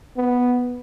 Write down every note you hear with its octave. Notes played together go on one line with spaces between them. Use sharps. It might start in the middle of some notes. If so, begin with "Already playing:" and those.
B3